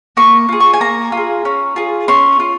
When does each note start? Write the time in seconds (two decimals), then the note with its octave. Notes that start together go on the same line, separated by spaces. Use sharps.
0.17 A#3 C#6
0.49 F4 G#4
0.60 C#6
0.74 G#5
0.80 A#3 A#5
1.12 F4
1.17 G#4
1.45 C#4
1.76 F4 G#4
2.08 C#4 C6
2.40 F4